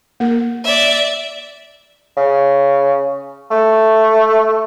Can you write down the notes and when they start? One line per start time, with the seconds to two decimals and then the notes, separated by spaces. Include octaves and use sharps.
0.20 A#3 A#4
0.64 D5 E5
2.17 C#3
3.51 A3